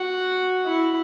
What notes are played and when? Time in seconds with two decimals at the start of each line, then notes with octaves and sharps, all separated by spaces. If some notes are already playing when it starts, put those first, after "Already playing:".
Already playing: F#4
0.64 E4